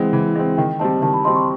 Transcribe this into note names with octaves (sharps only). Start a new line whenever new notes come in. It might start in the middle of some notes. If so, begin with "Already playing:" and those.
Already playing: E3 G#3 C4 F#5
E3
G#3 C4
D#3 G5
G3 C4 D#4 A5
D#3 A5
B5
G3 C4 D#4 C6
C#6